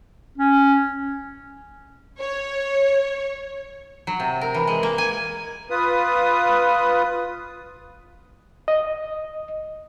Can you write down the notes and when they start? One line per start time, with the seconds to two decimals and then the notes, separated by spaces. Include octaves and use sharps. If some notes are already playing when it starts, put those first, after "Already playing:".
0.38 C#4
2.20 C#5
4.07 F#3
4.20 C3
4.41 A#4
4.54 E3
4.67 G#3
4.83 A#3
4.98 G#5
5.70 F4 B4 D#6
8.68 D#5